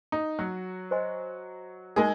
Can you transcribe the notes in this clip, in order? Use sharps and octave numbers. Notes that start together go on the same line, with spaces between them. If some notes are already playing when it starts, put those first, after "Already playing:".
D#4
F#3 F#4
C5 D#5 G#5 C6
G#3 D#4 G#4 A#4 D#5